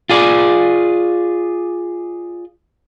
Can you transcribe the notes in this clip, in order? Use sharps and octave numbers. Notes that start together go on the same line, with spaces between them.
F4 G#4 D5